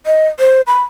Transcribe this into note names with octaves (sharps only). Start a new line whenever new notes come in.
D#5
C5
B5